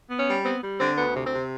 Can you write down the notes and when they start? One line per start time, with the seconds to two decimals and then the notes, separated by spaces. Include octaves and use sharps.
0.10 B3
0.19 C#4
0.27 G3
0.45 B3 C4
0.63 G3
0.80 D3 C4
0.98 D2 B3
1.16 C3
1.25 C4
1.34 C3